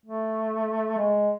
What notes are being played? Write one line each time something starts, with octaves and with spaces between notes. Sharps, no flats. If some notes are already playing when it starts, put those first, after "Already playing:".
A3
G#3